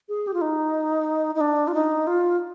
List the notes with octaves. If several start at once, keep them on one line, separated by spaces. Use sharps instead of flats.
G#4
G4
F4
D#4
D#4
D4
F4
D#4
F4